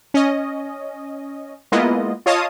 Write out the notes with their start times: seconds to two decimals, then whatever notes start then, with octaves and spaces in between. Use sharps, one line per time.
0.14 C#4 D#5
1.72 G#3 A#3 B3 E4 F4 D#5
2.26 F4 C#5 D#5 F5 A5 D#6